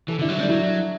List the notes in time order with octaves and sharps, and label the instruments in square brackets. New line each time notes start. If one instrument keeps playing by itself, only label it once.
[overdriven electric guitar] E3 [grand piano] A4
[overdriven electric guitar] D3 [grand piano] E4
[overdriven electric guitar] F#3
[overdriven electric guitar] G3 [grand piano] D4
[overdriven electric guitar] F#3 [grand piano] E4